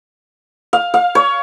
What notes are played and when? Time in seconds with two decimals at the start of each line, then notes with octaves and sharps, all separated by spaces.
0.73 F5
0.94 F5
1.15 C#5